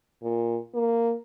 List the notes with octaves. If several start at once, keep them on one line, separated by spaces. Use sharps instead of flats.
A#2
A#3